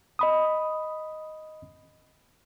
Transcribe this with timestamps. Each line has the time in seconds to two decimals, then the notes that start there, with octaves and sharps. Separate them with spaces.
0.19 D#5 B5 D#6